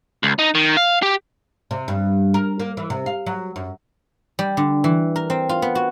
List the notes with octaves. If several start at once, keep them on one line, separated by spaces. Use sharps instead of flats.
C#2
D#4
D#3
F5
G4
C3
G2
A#4
A#3
E3
C3
F5
F#3
F#2
G3
D3
E3
A#4
C4
F4
B3
F#4